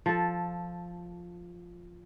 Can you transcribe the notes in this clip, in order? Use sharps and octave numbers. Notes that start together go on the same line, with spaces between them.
F3 A4